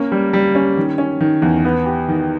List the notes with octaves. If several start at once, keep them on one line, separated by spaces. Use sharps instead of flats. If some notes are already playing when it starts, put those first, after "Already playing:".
Already playing: A#3 C#4
G3
G3
C#4
D#3
C#4
D#3
E2
B3
G4
D#3